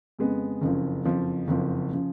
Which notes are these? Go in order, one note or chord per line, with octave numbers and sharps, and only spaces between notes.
F2 C#3 G#3 B3
F#1 F2 C#3 F3
F#1 F2 C#3 F3
F#1 F2 C#3 F3
C#3 F3